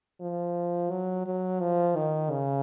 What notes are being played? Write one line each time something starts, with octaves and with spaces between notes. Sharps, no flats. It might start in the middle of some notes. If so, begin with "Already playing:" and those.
F3
F#3
F#3
F3
D#3
C#3